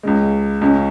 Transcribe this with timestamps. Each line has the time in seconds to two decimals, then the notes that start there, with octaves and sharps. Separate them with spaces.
0.03 C#2 C#3 G#3
0.61 C#2 C#3 G#3 C#4